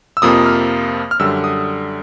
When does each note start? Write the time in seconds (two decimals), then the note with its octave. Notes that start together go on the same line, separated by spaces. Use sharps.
0.17 E6
0.22 F2 C3 F3 A#3 D#6
0.46 F6
1.11 F6
1.19 F#2 D3 G3 E6
1.44 D#6